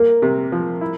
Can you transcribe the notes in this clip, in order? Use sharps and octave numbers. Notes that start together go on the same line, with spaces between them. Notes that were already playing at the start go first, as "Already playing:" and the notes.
Already playing: A#3 A#4
C3
F3
E4